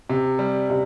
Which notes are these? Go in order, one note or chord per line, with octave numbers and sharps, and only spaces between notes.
C3
G3
C3